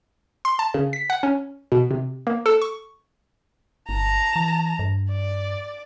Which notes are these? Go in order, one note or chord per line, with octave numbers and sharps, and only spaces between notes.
C6
A5
C#3
B6
F#5
C#4
B2
C3
A#3
A4
C#6
G1 A5 A#5
E3
G2
D5